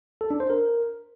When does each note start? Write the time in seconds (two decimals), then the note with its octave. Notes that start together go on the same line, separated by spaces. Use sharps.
0.21 A4
0.31 D4
0.40 C5
0.50 A#4